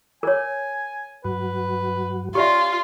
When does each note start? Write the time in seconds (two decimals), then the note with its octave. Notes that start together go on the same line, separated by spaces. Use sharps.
0.23 A#4 C#5 G#5
1.25 G2 F#3 F#4 B4
2.35 C#4 F4 G4 D5 E5